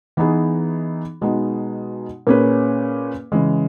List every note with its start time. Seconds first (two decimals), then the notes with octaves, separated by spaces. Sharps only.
0.17 E3 B3 D#4 G#4
1.21 B2 G#3 B3 D#4
2.27 A#2 A#3 C#4 G#4 B4
3.32 C#3 E3 G#3